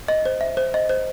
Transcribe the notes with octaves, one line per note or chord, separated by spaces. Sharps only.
D#5
C5
E5
C5
D#5
C5